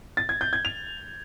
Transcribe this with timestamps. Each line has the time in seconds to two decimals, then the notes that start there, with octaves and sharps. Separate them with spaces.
0.17 A6
0.29 G#6
0.41 G6
0.53 G#6
0.65 F7